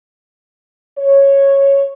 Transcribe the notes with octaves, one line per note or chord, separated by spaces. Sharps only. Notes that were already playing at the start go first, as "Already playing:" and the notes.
C#5